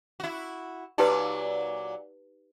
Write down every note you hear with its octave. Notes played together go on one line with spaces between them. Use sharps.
E4 F#4
A#2 F#3 D#4 G4 B4 D5